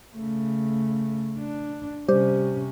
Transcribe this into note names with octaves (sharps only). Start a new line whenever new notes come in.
C#3 A3
D4
C3 G3 C#4 G4 C5